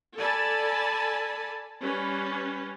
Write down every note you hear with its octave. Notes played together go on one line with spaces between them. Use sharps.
A4 D5 G#5 A5 B5
G3 C#4 B4